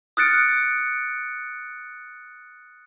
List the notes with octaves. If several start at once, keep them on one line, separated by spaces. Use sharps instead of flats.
D#6 F6 F#6 A6 C#7 D7